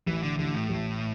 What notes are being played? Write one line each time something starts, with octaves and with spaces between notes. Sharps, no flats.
A1 E3
D3
A1 D3
A2
A1